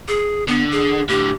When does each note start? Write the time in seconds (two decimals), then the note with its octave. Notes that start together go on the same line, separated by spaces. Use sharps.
0.08 G#4
0.48 D3 B3
0.72 G#4
1.08 A2 D3 G4